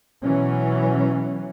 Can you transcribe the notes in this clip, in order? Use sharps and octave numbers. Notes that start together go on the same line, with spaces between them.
B2 E3 F#3 C#4